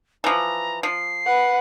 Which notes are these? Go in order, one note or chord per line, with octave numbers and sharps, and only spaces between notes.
E3 F3 A#5
F3 C7
B4 F#5